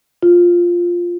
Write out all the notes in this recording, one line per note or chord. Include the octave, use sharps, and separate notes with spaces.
F4